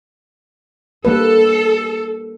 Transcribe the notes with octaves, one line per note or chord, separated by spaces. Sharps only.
G3 A#3 A4 B4